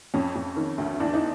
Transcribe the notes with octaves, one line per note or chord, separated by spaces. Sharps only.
F2 C#4
F2
D#3
D2
E2 D4
D#4